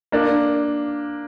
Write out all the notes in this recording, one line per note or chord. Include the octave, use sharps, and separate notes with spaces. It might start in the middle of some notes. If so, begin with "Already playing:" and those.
A#3 D4